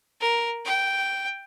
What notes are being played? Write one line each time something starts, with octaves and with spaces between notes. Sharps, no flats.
A#4
G5